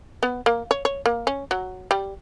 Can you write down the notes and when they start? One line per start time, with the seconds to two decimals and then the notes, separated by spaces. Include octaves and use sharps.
0.23 B3
0.46 A#3
0.71 C#5
0.85 C#5
1.06 A#3
1.27 C#4
1.51 F#3
1.91 G3